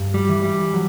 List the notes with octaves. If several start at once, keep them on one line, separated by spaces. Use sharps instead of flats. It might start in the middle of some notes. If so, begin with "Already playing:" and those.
Already playing: G2
G3
E3
G3
F#3